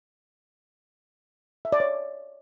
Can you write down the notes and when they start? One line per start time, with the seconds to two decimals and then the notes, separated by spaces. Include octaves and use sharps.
1.65 E5
1.72 D5
1.80 C#5